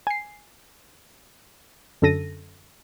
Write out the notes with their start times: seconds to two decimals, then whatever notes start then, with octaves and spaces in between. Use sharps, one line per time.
0.07 G#5 C7
2.02 F#2 D3 A4 A#6 D#7